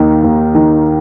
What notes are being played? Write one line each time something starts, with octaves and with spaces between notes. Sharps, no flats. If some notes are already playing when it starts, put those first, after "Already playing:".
Already playing: D#2 D#3
D#2
D#3